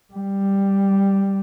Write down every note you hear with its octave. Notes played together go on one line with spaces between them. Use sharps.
G3